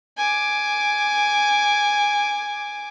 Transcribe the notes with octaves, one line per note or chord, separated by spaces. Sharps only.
G#5 D6